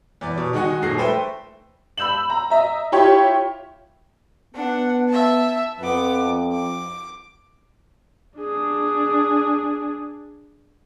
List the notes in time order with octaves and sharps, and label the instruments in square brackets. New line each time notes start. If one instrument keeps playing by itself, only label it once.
[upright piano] E2 D5
B2
D#3 G#3 D#4 F#4 G#5
D#1 D#2 F3 G#4 A#6 C7
A3 B4 C5 E5 G5
[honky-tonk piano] B5 E6 G6 E7 F#7
A#5
D#5 E5 A#5
E4 F4 G4 C#5
[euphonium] B3 [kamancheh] D4 F#5
[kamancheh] E5 A5
[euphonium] F2 [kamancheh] B3 D6
[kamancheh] D6
[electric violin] D4 G#4